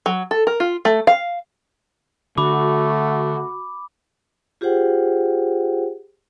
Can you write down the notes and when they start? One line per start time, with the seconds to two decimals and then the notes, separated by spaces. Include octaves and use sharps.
0.06 F#3
0.31 A4
0.47 A#4
0.60 F4
0.85 A3
1.07 F5
2.38 D3 A3 F#4 B5 D6
4.61 F4 G4 G#4 C5 F#5 G5